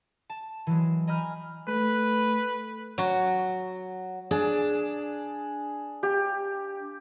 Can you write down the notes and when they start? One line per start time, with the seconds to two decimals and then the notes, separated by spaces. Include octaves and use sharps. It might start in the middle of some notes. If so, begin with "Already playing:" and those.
0.30 A5
0.67 E3 F#3 G#3
1.07 D#5 G#5 A#5 B5 F6 G6
1.68 A3 B4
2.98 F#3 F#4
4.31 D4 G#4
6.03 G4